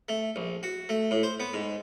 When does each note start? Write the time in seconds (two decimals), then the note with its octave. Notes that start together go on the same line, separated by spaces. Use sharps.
0.09 A3
0.36 A#1
0.63 F#4
0.89 A3
1.11 A2
1.23 C5
1.40 B3
1.53 G#2